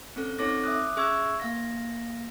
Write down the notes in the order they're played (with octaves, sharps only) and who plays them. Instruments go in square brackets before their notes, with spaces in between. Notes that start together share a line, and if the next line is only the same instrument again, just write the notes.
[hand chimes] C4 C#4 A4
C4 D#4 A4 C#5 D6 A#6
E5 D6 D#6 F#6
C#4 G#4 E5 C#6 E6 G#6
A#3 F5 A#6